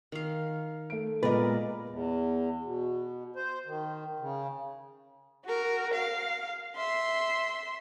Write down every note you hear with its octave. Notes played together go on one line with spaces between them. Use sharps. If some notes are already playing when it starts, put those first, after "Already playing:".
D#3 F5
A3 D7
A#2 G#3 B3 A#4 B4 D5 D#5
E2
B2
C5
D#3
C#3
F#4 A#4
F5
E5 C6